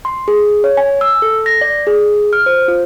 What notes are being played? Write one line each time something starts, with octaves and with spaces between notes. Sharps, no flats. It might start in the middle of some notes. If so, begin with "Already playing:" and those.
C6
G#4
C#5
G#5
E6
A4
A#6
D5
G#4
F6
C5
F4